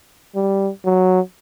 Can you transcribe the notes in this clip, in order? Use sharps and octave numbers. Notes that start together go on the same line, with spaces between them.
G3
F#3